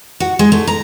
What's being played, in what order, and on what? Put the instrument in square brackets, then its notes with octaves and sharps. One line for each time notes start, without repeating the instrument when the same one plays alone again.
[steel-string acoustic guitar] F#4
G#3
A3
A#5